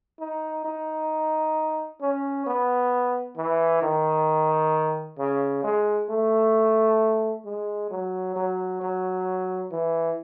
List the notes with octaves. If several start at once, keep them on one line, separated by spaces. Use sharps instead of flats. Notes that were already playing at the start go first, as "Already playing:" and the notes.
D#4
D#4
C#4
B3
E3
D#3
C#3
G#3
A3
G#3
F#3
F#3
F#3
E3